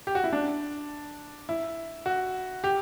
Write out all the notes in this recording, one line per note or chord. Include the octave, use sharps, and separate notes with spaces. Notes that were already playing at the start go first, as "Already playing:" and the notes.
G4
F#4
E4
D4
E4
F#4
G4